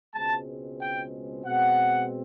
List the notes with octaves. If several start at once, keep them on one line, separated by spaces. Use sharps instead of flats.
C#2 B2 G#3 C4 A5
G5
B2 G#3 C4 F#5